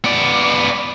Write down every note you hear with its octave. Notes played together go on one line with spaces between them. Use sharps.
B3 D5